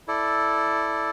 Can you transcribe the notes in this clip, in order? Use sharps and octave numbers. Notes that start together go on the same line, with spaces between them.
E4 A4 D5